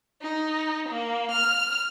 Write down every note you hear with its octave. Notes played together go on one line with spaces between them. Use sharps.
D#4
A#3
F6